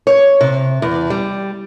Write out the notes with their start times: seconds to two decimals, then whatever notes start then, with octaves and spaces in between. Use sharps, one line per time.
0.07 C#5
0.41 C3
0.82 E2
1.10 G3